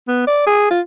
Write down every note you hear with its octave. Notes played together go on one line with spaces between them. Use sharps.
B3
D5
G#4
F4